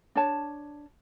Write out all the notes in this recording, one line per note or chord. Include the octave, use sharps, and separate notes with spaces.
D4 C#5 A5